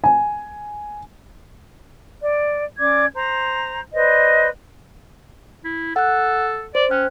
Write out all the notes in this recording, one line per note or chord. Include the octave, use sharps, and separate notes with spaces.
G#5
D5
C#4 D5 D6 G#6
C5 A#5
B4 C5 D5 D#5
E4
A4 F#5 F#6
C5 D5
C#4 G5 F#6